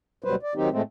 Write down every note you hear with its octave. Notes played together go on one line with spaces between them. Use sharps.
D2 B2 F#3 G3 B4 C5
D5
D#3 F#3 C4 D#4 G4
A2 G#3 A3 C4